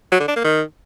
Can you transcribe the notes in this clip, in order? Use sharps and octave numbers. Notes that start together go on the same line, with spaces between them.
F#3
D3
D4
A#3
D#3